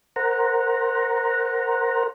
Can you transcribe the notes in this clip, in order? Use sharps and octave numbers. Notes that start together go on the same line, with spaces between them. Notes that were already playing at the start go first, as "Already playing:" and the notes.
A#4 C5 F#5 A#5